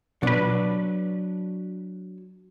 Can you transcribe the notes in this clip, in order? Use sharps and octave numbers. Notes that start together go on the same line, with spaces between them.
B2 F#3 D4 B4